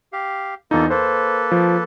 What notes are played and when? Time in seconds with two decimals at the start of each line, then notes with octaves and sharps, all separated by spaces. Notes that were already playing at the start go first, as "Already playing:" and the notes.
0.13 G4 F5
0.71 E2 A#3 D#4 F4 A4
0.90 A#3 A4 B4 C5
1.52 F3